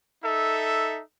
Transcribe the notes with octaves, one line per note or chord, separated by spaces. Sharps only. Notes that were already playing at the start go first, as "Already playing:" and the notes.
D#4 A4 E5